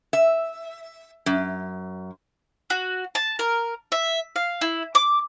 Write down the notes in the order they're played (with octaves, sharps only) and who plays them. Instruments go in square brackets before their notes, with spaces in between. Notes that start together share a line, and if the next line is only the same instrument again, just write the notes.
[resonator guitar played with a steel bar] E5
F#2
[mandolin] F#4
A5
A#4
E5
F5
E4
D6